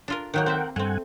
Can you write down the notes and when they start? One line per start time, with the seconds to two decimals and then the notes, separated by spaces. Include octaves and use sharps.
0.08 D4 F4 A#4
0.34 D#3 F#3 A#3 A#4 F#5 G5
0.46 C4 C5 E5
0.76 G2 A3 C4 F#5 G#5